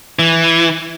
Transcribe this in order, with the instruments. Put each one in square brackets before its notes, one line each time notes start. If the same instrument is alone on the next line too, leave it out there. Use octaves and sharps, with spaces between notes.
[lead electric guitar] E3